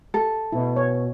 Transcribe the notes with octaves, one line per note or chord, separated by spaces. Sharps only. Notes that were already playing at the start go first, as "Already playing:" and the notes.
A4
B2 E4
C#5